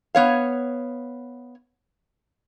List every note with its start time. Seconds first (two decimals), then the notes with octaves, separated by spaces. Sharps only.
0.15 B3 C#5 F5